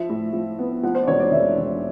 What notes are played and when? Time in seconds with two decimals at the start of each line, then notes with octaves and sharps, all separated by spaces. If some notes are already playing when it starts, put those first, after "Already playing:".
Already playing: F3 E5
0.09 A2
0.33 F3
0.59 B3
0.83 F3 F#5
0.95 C5
1.03 D5
1.08 E1 C#5
1.20 D5
1.32 E1 E5
1.58 E1